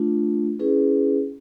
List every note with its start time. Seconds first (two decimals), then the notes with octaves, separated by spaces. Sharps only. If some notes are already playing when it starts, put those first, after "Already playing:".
Already playing: A3 D4 F4
0.59 C#4 E4 G#4 B4